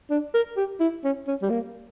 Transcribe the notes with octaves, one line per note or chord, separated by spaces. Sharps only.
D4
A#4
G4
E4
C#4
C#4
G3
A#3